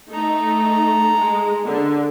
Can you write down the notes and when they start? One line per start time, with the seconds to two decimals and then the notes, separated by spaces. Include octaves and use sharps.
0.11 A3 D#4 A4 A#5
1.15 G#3
1.66 D3